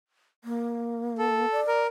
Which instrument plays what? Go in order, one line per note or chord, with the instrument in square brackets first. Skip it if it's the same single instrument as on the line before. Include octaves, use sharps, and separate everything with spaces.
[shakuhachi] A#3
[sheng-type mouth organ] A4
[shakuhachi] D5
[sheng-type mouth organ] A#4